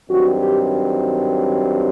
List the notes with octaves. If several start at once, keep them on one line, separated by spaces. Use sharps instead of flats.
G2 D#3 F#3 C4 F#4
G4